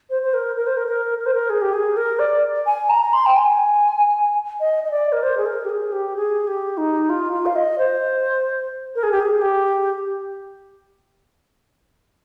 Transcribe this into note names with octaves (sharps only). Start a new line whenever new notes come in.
C5
C5
A#4
A#4
C5
A#4
A#4
A#4
C5
A#4
G#4
G4
G#4
A#4
D5
G#5
A#5
A#5
C6
G5
G#5
D#5
D#5
D5
A#4
C5
G#4
A#4
G4
G#4
G4
G#4
G4
D#4
F4
F4
F5
D#5
C5
A#4
G#4
G4
G#4
G4